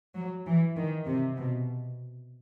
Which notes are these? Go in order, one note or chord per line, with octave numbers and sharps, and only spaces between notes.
F#3
E3
D#3
C3
B2